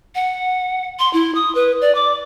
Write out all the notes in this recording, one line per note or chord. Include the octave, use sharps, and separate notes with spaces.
F#5
C6
E4
D#6
B4
D5
D6